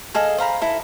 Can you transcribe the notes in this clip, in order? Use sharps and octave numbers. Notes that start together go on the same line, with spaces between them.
G#4 A4 D#5 F5
C5 F5 A#5 B5
E4 A4